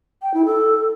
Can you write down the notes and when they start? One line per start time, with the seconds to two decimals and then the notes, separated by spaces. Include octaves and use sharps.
0.22 G5
0.34 E4
0.45 A4